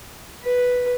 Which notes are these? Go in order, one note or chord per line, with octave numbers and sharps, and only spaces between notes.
B4